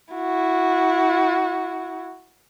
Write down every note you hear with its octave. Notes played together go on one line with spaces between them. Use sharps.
E4 F#4